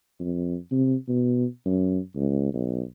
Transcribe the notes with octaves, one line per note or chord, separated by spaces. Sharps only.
F2
C3
B2
F#2
C#2
B1